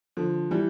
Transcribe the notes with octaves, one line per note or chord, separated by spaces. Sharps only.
D3 F3
E3 G3